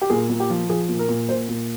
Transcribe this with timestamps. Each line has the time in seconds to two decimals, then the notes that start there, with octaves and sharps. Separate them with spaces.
0.02 G4
0.10 A#2 G#4
0.30 A#2
0.40 G4
0.50 F3
0.69 F3 G#4
0.89 A#2
0.99 A#4
1.09 A#2
1.29 A#2 C5
1.49 A#2